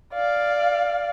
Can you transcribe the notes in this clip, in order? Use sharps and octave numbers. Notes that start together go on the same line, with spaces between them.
D5 F5